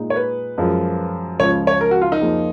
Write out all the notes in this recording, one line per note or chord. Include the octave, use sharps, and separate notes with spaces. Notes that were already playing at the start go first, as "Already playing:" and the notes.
Already playing: A#2 G#3 D#4
C#5
B4
F#2 F3 G#3
C#2 C#3 F3 C#5
C#5
A#4
F#4
F4
D#4
F2 F3 A#3 F4 G#4